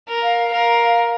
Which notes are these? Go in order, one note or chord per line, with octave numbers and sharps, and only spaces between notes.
A#4
F5
A#4